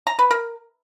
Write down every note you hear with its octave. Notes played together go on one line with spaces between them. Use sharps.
A#5
B4
A#4